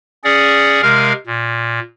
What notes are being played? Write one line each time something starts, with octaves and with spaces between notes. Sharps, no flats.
C#4 G#4 D5 F#5
C3 G#3 A#4 F5 F6
A#2